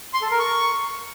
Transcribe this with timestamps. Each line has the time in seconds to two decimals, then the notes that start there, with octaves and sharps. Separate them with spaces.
0.14 C6
0.22 A4
0.31 A#4
0.39 C#6